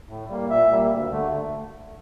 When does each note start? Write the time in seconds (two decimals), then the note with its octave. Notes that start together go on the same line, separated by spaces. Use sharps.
0.09 A2
0.29 G3 A#3
0.49 A#2 E5
0.71 G3 A#3
0.91 D2
1.11 D3 A3